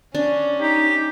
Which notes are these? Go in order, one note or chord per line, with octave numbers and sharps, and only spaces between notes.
C#4 D4
D#4 G4